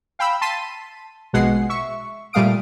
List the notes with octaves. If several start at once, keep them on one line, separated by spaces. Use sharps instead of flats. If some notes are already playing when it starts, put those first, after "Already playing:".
F5 G5 B5 E6
A5 C6 B6 D#7
A#1 B2 G#3 F#5 C7
E5 C#6
A#2 G3 A3 F5 D#6 D7